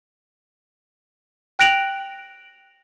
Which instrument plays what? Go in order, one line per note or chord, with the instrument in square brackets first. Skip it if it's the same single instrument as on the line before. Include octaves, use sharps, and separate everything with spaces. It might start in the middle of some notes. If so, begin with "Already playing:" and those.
[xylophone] G5 F#6 A#6 D7 F7 F#7